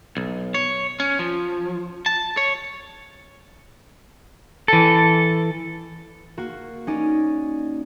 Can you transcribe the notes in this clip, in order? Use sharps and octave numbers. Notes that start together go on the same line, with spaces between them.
B1
C#5
C#4
F3
A5
C#5
E3 A4
A#3 F#4
C#4 D#4 D5